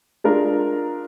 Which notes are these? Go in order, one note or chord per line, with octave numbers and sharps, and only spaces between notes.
G#3 D4 F4 A#4